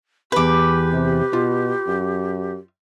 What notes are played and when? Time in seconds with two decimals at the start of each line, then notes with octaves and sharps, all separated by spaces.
0.32 E2 G4 B4 B5 D6
0.93 C3
1.33 B2 F4
1.87 F#2